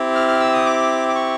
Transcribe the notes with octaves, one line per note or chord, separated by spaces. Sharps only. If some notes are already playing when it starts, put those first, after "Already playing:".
Already playing: C4 E4 G4
F6
F6
E6
D#6
D6
D6
C#6